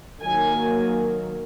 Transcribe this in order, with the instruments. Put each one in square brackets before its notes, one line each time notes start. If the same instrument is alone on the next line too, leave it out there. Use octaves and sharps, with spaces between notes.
[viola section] D#3 F#3 A#3 G#5